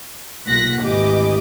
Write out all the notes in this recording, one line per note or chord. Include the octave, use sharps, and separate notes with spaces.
B1 A#2 F#5 F#6 A#6 B6
G#1 D2 E3 G4 D#5 D6